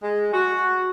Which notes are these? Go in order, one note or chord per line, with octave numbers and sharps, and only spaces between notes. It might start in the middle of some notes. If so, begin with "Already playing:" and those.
G#3
F#4